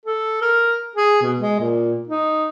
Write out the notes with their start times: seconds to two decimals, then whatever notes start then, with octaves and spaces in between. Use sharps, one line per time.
0.06 A4
0.42 A#4
0.96 G#4
1.22 B2
1.39 G#3
1.60 A#2
2.08 D#4